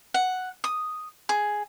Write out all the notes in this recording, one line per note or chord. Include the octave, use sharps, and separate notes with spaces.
F#5
D#6
G#4